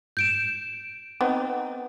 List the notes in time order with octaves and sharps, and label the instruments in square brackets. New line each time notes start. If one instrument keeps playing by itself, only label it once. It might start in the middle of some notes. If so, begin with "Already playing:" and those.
[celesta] G6 D7 E7
[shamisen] B3 C4 D#4